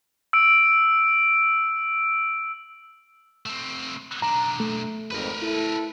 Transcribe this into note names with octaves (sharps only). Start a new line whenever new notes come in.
E6 D7
A3 C4
B1 D4 A#5
A3
G#1 F2 A#4 B4
E4 A4